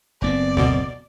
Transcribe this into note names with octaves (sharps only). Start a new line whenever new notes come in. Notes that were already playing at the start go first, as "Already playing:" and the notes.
F#1 B3 C4 D5
D2 B2